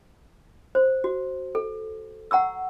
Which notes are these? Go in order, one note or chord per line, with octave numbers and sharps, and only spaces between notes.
C5
F#4
A4
F#5 A#5 C#6 E6